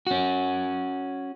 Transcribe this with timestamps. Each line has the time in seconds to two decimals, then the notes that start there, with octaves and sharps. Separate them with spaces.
0.07 C#4 F#4